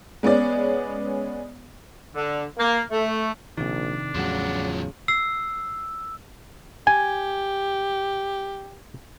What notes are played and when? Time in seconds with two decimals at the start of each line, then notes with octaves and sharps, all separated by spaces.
0.23 G#3 B3 C#4 D5
2.15 D3
2.58 A#3
2.91 A3
3.57 A#1 C3 D#3 D4
4.15 E2 A2 C#3 F3 F#3 F#4
5.08 E6 C7
6.87 G4 G#5